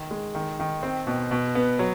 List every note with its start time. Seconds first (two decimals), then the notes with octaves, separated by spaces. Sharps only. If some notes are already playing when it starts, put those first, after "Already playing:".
Already playing: D#3
0.11 G#3
0.35 D#3
0.60 D#3
0.83 C4
1.07 B2
1.31 B2
1.55 B3
1.79 F#3